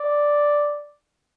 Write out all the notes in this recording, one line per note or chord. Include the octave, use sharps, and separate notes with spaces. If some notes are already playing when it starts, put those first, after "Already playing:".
Already playing: D5